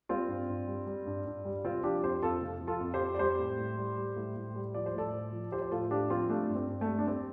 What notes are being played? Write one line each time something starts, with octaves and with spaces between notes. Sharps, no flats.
G3 C4 F4
G2
G2
G3
G3
G2
G2
G3
C3 C4 F4
F3 D4 G4
F2 G4 C5
F2 F4 A4
C3
F3
F4 A4
F2
G4 C5
F2
D5
G3 G4 C5
A2
A2
G3
G3
A2
A2
G3
F3 D5
C5
A2 A4 D5
A2
F3
F3 G4 C5
C5
A2 F4 A4
A2 D4 G4
F3 C4 F4
G3 A3 D4
G2
C4
G2
A3
G3
D4
G3 C4